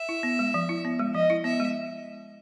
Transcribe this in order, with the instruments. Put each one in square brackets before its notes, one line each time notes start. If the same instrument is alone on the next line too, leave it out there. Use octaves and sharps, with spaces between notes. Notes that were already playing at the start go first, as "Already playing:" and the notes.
Already playing: [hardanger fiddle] E5
[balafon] E4
B3
G#3
F3
E4
B3
G#3
[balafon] F3 [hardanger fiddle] D#5
[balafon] E4
[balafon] B3 [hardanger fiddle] E5
[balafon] G#3